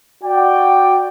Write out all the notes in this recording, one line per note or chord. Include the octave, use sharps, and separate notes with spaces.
F#4 D5 G5